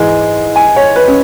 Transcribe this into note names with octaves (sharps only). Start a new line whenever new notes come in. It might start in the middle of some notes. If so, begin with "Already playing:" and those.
Already playing: G#2 E3 G#3 G#5
G#5
C#5
B4
C#4